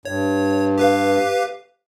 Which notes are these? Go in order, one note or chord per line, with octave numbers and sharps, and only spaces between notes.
G2 C#5
G4 B4 F5